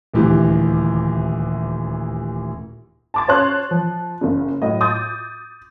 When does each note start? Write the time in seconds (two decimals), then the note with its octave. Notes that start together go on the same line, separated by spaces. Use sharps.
0.14 D#1 D2 E3 G4
3.14 A5 D6 A6
3.28 C#4 C5 C#5 A5 C6 F#6
3.71 F3
4.21 F#1 C#3
4.62 A2 F#3 D#5
4.80 D6 D#6 G6 A6